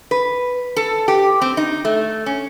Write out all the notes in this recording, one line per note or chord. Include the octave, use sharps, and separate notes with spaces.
B4
A4
G4
C4
D#4
A3
C#4